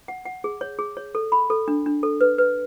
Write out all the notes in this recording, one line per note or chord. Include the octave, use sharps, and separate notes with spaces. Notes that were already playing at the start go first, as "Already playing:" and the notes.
F#5
F#5
G#4
C#5
G#4
C#5
A4
B5
A4
D4
D4
A4
B4
B4